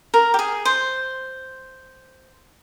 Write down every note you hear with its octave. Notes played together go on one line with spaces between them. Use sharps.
A#4
G4
G#4
C5